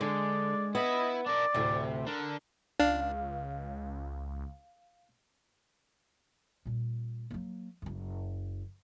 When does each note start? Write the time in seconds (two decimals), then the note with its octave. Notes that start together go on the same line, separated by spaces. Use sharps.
0.01 D3 G#3 D5
0.75 B3 E4 D#5 B5
1.26 D4 A#4 D5
1.54 D2 A2 C3
2.07 D3 D4 A#4
2.80 C#2 D4 F5
6.65 A#2 G3
7.31 F#3 A#3
7.82 F#1 F#2